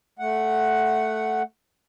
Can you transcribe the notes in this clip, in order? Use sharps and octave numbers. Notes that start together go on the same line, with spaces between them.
A3 F#5